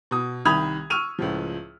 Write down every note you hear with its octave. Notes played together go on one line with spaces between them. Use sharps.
B2 D#6
C2 D#3 B5 D#6 G#6 F7
C#6 E6 F6 D#7 F7
C#2 A2 F3